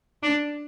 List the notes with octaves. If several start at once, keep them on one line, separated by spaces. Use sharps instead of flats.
D4